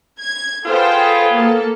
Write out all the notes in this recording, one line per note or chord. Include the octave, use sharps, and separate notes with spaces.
G#6
B3 F4 G#4 A4 C5 G5
A#3 A4